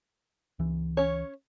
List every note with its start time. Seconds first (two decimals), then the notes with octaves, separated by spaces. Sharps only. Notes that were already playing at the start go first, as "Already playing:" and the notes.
0.59 C#2 E3
0.97 C#4 C#5